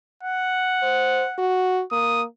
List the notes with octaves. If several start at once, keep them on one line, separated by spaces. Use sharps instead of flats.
F#5
C5
F#4
A#3 D#6